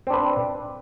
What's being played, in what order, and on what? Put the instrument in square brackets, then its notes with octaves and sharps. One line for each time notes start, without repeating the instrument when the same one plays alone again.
[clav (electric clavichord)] C4
D4
B4